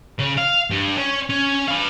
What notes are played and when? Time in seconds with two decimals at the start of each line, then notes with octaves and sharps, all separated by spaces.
0.19 C#3
0.37 F5
0.70 G2
0.97 C#4
1.30 C#4
1.68 B4 F5